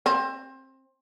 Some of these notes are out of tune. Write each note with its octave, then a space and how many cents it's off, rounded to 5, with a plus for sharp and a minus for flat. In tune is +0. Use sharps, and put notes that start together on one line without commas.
C4 +25